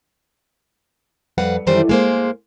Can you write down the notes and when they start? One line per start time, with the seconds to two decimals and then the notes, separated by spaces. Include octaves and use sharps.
1.38 F2 G3 B4 F5 F#5
1.67 F#2 D#3 E3 G3 A3 C5
1.89 G#3 A#3 C5